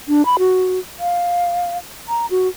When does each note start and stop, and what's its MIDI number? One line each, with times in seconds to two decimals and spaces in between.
0.09 0.25 62
0.26 0.36 83
0.39 0.79 66
1.00 1.78 77
2.09 2.26 82
2.31 2.48 66